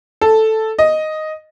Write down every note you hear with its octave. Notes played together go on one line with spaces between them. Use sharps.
A4
D#5